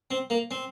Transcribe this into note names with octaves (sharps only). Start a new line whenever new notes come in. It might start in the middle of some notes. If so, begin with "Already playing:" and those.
C4
A#3
C4